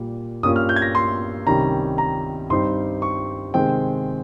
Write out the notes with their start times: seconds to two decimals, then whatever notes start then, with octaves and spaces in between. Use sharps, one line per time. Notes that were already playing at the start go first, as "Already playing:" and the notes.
Already playing: A#2 G3 A#3
0.43 G2 G3 A#3 C#4 F4 D#6
0.56 F6
0.69 G6
0.76 G#6
0.82 A#6
0.95 C6
1.46 C2 C3 D#3 G3 C#4 A#5
1.98 A#5
2.50 G2 G3 C4 D#4 C6
3.02 C#6
3.54 C3 D#3 G#3 C4 G5